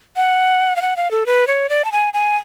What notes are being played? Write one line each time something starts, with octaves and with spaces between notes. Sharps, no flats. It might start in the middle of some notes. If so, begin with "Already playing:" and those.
F#5
F5
F#5
F5
A4
B4
C#5
D5
A5
G#5
G#5